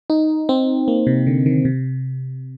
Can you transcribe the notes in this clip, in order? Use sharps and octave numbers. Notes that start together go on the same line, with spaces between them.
D#4
C4
A#3
C3
D3
D#3
C3